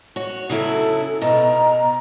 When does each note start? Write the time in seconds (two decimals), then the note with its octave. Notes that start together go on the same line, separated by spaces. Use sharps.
0.16 F#4 C#5
0.50 C#3 F#3 E4 A4
1.22 B2 A#5